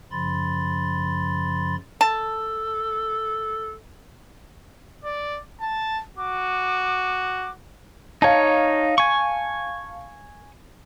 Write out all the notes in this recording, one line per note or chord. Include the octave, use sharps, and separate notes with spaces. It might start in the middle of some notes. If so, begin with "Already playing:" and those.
F#2 C#3 F3 B5 C6 A6
A4 A5
D5
A5
F#4 D6
D#4 C#5 F5 A5
G#5 C#6